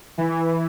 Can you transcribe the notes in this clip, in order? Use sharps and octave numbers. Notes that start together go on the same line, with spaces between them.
E3